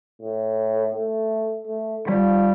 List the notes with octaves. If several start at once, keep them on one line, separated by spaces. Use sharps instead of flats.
A2
A3
A3
F3 G3